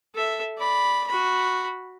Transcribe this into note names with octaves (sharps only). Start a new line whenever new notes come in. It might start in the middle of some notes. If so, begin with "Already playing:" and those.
A4 E5
D5 B5
F#4 B5